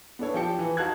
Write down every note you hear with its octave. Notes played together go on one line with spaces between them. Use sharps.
B3 D4 A4 C#5
F3 G4 G5 A5 C#7
E3
D#4 F#4 F5 A5 F#6 G#6